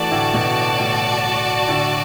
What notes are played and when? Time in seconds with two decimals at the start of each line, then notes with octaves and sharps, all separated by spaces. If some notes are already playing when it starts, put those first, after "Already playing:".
Already playing: E3 A3 F#4 D5 A5
0.11 A2 D3
0.33 B2
0.79 A2
1.68 A2 D3